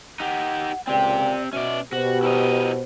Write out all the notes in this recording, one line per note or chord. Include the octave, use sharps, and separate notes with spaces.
D#4 G4 F#5
C#2 A#2 C4 G4 D5 G5
B2 C#4 D5 E5
B2 F#4 G4 C5
E4 A#4 C5 D#5